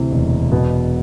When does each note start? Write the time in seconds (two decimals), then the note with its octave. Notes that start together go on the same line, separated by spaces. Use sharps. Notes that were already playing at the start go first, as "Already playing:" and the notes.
Already playing: D2 C3 E3
0.11 E1
0.52 B2